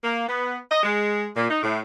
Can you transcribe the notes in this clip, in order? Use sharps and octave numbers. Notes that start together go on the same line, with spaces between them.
A#3
B3
D#5
G#3
A#2
D#4
A2